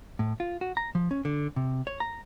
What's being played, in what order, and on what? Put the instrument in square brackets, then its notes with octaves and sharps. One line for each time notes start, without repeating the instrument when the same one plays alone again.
[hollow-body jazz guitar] A2
F4
F#4
A#5
F3
C#4
D3
C3
C#5
A#5